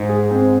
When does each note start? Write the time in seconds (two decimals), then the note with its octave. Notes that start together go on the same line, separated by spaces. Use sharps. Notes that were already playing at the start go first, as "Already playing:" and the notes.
Already playing: G#2 G#3
0.09 G#4
0.31 C4